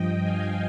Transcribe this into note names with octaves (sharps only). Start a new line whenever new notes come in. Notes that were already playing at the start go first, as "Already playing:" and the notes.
Already playing: G2 F3 D#5 G5
F5 G#5